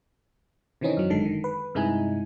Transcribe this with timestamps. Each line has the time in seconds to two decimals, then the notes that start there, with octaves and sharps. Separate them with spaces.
0.81 C3 D#3 E3 C4 C#4 D#4
0.97 F#2 F#3
1.10 G1 D3 D#3 G#3 A4 C7
1.25 D#3
1.44 B4
1.75 G2 C3 G#3 D#4 E4 G#5